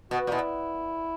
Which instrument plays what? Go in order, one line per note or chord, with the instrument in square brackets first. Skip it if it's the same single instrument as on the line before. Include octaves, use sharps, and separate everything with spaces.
[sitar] B2 [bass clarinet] F#4
[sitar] A#2
[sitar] B2 [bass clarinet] E4